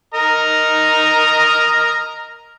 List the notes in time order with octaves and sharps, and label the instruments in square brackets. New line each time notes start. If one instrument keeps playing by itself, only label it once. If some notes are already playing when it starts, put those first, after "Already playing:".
[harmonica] A#4 D#5 A#5